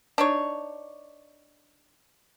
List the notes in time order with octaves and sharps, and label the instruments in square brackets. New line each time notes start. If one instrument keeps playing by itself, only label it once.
[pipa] D4 D#4 C#5